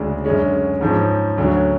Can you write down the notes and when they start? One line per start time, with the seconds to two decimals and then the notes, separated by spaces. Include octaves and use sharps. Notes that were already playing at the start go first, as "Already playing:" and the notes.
Already playing: D2 C#3 G#3 D4
0.25 F#2 D3 G#3 C#4
0.81 G#2 F3 G#3 C#4
1.38 D2 D3 F#3 C#4